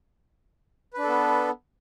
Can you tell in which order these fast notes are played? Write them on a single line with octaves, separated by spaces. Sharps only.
B4 D4 A4 B3